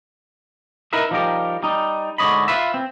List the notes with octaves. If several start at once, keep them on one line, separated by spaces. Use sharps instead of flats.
D#4 E4 A#4 B4 E5
F3 G3 D#4 G4 A#4
G3 D#4
G#2 D3 C#5 D#5 B5
F4 B4 E5
C4